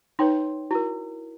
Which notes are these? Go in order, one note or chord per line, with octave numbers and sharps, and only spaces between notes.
D#4 B4 C#5 G5 C6
E4 F#4 A#4